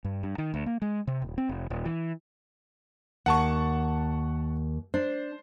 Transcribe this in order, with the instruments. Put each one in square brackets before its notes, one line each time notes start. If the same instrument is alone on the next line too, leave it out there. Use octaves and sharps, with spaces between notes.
[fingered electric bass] G2
G2
D#3
D2
A#3
G#3
C3
D#1
C4
F1
D#1
E3
[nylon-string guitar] D#2 [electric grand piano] F#5 A5 C#6
[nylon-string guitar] D4 [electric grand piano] C5